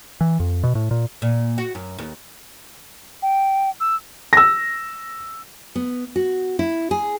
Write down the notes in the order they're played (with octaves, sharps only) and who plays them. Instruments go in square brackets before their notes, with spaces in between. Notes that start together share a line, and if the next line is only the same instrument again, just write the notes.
[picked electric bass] E3
F2
B2
A2
A#2
[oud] A#2
F#4
F#2
D#2
[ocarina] G5
E6
[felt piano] E6 A#6
[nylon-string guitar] B3
F#4
E4
G#4